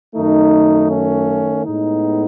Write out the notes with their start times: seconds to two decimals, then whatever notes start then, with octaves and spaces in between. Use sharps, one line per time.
0.15 F#2 D#3 A3 D#4
0.90 C#4
1.66 A2 G#3 B3 D#4